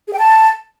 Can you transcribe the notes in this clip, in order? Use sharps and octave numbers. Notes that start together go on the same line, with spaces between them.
G#4
G5
A5